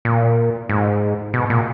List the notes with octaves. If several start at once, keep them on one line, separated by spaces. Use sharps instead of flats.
A#2
G#2
B2
A#2